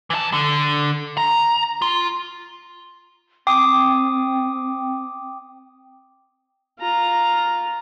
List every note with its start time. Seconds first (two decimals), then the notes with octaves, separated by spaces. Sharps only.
0.10 E3 A5
0.33 D3
1.17 A#5
1.82 F4
3.47 C4 G5 D6 D#6
6.80 F4 A#5